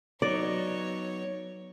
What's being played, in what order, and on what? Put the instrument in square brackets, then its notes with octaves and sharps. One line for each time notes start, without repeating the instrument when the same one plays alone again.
[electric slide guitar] F#3 B3 D#4 [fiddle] C#5 [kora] D5